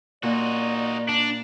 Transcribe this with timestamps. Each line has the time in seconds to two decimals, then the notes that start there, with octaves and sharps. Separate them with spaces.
0.23 A#2 D#4 F#4 D5
1.09 D4